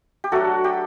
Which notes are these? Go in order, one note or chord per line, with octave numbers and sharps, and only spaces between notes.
G4
F#3 A3 D4 F#4 A4
G4